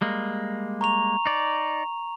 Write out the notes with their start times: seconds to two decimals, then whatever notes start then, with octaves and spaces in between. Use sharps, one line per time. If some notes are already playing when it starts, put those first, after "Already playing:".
0.01 G3 G#3 A#3
0.81 A#5 C#6 F7
1.26 D#4 D5